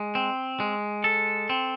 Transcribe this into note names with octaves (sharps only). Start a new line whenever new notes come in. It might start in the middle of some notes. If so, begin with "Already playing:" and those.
Already playing: G#3
C4
G#3
A4
C4